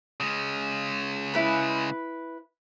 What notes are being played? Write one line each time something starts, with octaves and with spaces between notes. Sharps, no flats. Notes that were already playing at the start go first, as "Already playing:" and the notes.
C#3 G#3
E4 B4 B5